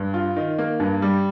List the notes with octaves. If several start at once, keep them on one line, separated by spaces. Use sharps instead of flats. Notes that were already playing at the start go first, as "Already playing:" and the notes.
Already playing: G2
F4
D#3
A#3
G2
G3